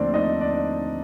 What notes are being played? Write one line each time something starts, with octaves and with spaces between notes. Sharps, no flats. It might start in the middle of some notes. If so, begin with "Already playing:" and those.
Already playing: D#2 D3 F3 A3 C4 D4 C5 D5
D#4 D#5
D4 D5